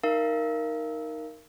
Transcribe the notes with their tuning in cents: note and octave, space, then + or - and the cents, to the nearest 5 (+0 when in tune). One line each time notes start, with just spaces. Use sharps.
D#4 +0 A#4 +0 F5 -30